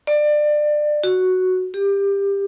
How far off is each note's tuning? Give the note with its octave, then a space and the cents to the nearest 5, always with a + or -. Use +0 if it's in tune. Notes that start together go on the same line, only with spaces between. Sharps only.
D5 +25
F#4 +0
G4 +20